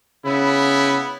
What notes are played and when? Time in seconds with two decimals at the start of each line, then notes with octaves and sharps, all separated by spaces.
0.25 C#3 B3 E4